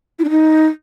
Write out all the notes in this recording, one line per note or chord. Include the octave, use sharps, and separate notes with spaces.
E4
D4
D#4